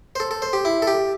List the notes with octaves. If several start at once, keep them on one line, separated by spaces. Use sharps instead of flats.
C5
A4
A4
C5
G4
E4
A4
G4